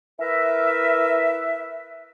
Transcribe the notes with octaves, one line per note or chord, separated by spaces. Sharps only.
E4 A#4 B4 E5